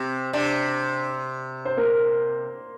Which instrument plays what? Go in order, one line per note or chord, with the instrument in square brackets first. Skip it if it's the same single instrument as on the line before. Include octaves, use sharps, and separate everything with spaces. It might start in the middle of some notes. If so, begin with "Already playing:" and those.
Already playing: [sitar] C3 [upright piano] C4
[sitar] C3 [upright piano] D4 D5
[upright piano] C5
A#3 A#4